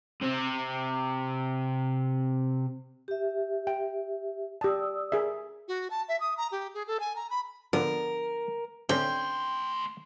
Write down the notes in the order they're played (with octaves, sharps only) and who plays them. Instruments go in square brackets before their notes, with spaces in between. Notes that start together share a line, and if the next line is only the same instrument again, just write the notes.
[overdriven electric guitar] C3 C4
[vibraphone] G4 E5
[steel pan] G5
[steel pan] G4 A5 [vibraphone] D5 D#6 E6
[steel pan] G#4 A#4 E5
[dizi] F#4
A5
E5
D#6
A#5
G4
G#4
A4
G#5
A#5
B5
[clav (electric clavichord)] D3 F3 B3 [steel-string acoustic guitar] A#4
[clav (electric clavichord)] D3 C4 C#4 [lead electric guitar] A3 C6 [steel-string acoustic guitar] G5